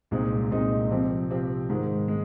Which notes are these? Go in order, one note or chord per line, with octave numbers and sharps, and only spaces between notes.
C2 A#2 G#3 C4 D#4
C2 A#2 G#3 C4 D#4
C3 F3 C4 G4
C3 F3 C4 G4
G#2 D#3 G#3
G#3